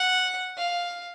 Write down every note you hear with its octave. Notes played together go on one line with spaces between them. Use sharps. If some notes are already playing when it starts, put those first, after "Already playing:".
Already playing: F#5
F5